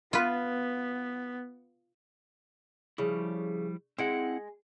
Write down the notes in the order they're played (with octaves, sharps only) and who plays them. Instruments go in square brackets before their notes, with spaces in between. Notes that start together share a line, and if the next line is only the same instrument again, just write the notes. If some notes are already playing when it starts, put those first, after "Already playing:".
[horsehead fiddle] B3 [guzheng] F4 B4
[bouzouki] C#3 [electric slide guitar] F3 G3 E4
[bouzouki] G#3 [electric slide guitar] C4 E4 F#5